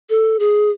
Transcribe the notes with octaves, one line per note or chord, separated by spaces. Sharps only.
A4
G#4